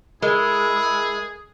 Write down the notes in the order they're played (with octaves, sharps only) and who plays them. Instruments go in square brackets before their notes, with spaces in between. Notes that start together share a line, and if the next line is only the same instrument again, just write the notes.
[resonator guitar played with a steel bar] G#3 [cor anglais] E4 [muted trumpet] G#4 [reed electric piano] A#4